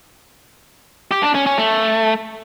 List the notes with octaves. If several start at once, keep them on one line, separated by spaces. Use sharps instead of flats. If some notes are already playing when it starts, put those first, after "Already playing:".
G4
D4
C#4
C#4
A3